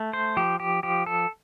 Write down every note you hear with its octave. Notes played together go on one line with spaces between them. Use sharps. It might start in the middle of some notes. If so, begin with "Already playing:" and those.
Already playing: A3
C5
F3 G4
G4
F3 G4
A4